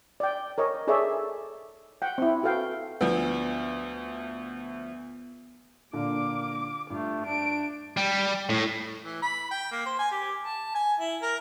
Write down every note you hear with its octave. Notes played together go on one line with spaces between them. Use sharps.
D5 G5
A#4 C#5 D#5
D#4 G#4 A4 C#5 D5 E5
F#5 G5
C4 E4
F#4 A4 B4 F5 G5
D2 F3 B3
A#2 D3 A#3 D6
G2 A3 F4
D4 D7
G3
A2
E3
B5
G5
A#3
C5
G#5
G4
A5
G#5
E4
A#4